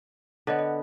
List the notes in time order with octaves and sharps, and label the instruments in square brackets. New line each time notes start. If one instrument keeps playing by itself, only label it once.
[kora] D3 B3 [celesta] A4 C#5 D#5
[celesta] D#5